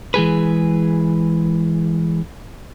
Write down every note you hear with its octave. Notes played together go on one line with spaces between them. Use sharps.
E3 G#3 G#4 B4